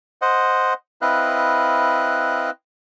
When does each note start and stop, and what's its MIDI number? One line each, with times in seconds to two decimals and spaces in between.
0.22 0.73 72
0.22 0.73 75
0.22 0.73 78
1.02 2.50 60
1.02 2.50 64
1.02 2.50 71
1.02 2.50 75
1.02 2.50 77
1.02 2.50 90